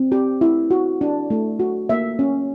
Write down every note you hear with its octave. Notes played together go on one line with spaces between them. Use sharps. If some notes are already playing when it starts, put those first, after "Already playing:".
Already playing: C4
G4
E4
F#4
D4
A3
F#4
A#3 E5
C#4